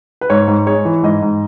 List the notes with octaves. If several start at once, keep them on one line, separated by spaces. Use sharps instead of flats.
B4
G#2 C#5
G#2
G#3 C#5
E3
G#2 D#5
G#2